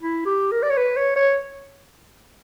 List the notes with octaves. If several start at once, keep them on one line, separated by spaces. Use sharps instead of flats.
E4
G4
A#4
D5
C#5
B4
C#5
C#5